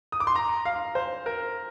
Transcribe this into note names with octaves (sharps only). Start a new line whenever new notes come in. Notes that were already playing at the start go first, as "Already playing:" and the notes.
D#6
D6
C6
A#5
F5
C5
A#4